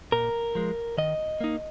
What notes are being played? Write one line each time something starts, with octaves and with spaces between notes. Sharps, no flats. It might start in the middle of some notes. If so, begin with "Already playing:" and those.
A#2 A#4
F3 G#3
D#3 D#5
A#3 D#4